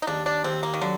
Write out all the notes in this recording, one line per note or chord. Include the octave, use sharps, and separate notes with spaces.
D#4
D#2 D4
D4
D#2 C4
A#3
D#3
D3 F#3